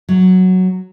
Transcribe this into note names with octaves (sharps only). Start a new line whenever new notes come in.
F#3